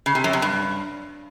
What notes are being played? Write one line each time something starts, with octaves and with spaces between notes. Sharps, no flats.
C#3
C3
F#2
C3
G2